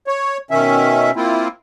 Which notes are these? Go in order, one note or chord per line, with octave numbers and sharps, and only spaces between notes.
C#5
B2 D#3 C#4 E5
A#3 C4 E4 F4